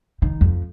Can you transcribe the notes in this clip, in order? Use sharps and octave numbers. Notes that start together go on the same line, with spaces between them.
D#3
F2